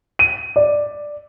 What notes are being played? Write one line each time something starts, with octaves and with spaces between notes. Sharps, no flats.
D#7
D5